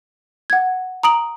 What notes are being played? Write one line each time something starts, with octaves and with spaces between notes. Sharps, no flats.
F#5 G#6
A#5 D#6 D7 F#7